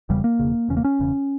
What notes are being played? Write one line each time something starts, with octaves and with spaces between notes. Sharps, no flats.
E1 E2 C#3 G3
A#3
E1 E2 C#3
E1 E2 C#3 C#4
A#3
C#4
E1 E2 C#3